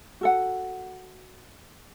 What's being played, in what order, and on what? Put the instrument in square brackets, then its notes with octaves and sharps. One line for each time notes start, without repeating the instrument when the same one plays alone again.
[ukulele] F#4 A4 F#5